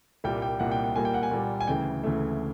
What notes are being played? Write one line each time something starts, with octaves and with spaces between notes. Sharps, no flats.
C2 A#2 G3 A#3 G5
G5
C2 A#2 G3 A#3 F#5
G5
G5
A#2 G3 A#3 G#5
G5
F#5
G#5
A#2 G3 A#3
G#5
D2 C#3 E3 A3 G5
D2 C#3 E3 A3